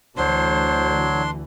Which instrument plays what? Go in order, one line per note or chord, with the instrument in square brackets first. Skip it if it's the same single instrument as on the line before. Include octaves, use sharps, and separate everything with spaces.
[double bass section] D2 D3 E3 [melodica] F#3 [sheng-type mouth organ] D4 C6 [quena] C5